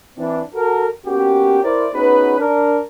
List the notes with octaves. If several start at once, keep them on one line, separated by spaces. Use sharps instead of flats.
E3 C4 D4
F#4 A4 A#4
A#3 B3 C#4 F#4 G4
E4 A#4 C5 D5
B3 C#4 D#4 F#4 G#4 B4
D4 A#4